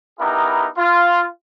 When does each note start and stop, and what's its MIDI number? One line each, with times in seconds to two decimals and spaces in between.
0.19 0.68 59
0.19 0.68 63
0.19 0.68 64
0.19 0.68 67
0.19 0.68 68
0.19 0.68 70
0.77 1.25 65